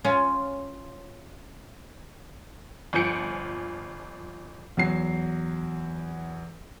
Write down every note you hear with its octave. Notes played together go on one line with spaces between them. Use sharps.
C#4 F4
G1 F3 G#5 G6 C#7 D7
E2 F#3 C7